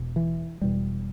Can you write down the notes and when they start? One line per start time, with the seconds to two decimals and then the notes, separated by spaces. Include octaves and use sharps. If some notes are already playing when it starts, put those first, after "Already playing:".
Already playing: E1 E2 B2
0.16 E3
0.61 E1 E2 B2 G3